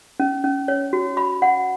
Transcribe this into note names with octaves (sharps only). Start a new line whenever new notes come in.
C#4
C#4
C#5
F#4
B5
F#5